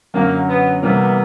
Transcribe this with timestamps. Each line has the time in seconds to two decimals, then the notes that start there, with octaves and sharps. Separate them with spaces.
0.14 F#2 D3 F#3 A#3
0.48 B3
0.82 C3 E3 G3 A#3 B3